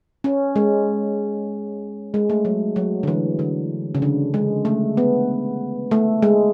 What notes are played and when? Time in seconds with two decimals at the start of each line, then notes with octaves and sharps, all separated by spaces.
0.24 C#4
0.56 G#3
2.14 G#3
2.30 A3
2.45 F#3
2.76 F#3
3.03 D3
3.07 E3
3.39 D3
3.95 C#3
4.02 D3
4.34 G#3
4.65 A3
4.97 B3
5.91 A3
6.22 G#3